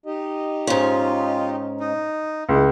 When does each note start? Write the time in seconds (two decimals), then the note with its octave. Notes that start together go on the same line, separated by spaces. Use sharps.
0.06 D#4 G4 D#5
0.67 G#2 C#4 F4
1.80 D#4
2.49 C#2 E4 F#5